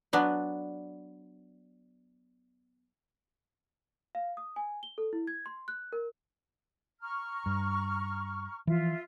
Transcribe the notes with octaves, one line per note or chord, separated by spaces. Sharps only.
F#3 B3 D4 B4
F5
D#6
G#5
G7
A4
E4
G#6
C6
F#6
A#4
A#5 C#6 F6
G2
E3 F3 F4 E5